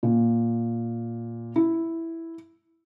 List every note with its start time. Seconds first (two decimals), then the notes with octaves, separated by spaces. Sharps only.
0.03 A#2
1.56 E4